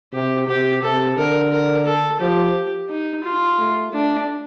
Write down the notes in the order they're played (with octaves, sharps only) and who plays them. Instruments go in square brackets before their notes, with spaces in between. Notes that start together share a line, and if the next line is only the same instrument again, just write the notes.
[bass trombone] C3 [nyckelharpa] G4
[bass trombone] C3 [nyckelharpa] G4
[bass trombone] C3 [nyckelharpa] A4
[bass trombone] D3 [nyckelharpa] A#4
[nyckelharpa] A#4
A4
[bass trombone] F3 [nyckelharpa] G4
[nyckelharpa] D#4
F4
[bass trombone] A3
[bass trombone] A3 [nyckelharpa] D4